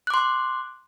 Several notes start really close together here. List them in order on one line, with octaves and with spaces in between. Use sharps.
F#6 D6 C6